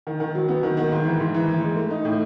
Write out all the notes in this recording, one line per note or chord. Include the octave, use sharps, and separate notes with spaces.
D#3
D#3
F#3
B3
D#3
D#3
G#2
E3
G#2
E3
E3
G#3
A3
D#4
A2